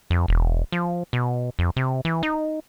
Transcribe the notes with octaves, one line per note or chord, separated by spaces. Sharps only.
F2
E1
F3
B2
F2
C3
E3
D#4